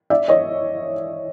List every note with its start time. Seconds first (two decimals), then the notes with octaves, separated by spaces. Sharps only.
0.10 D5 E5
0.28 C#5 D#5